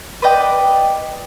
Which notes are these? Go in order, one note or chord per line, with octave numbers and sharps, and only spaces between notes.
B4 D5 D#5 G5